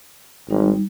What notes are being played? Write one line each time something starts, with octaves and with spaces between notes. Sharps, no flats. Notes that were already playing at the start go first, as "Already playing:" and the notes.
G#1 G3 D#4